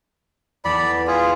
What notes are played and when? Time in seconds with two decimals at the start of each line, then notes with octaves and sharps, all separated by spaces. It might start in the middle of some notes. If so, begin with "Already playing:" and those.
0.65 E2 B3 A4 D5 B5
1.07 F4 G#4